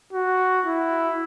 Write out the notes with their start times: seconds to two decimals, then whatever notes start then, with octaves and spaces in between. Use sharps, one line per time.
0.13 F#4
0.66 E4